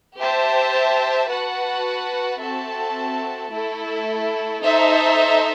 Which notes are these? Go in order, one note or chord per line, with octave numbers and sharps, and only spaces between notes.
G4 C5 E5 A5
F#4 B4 F#5 A5
C4 F#4 A4 E5 A5
A3 E4 A4
D#4 A4 C5 E5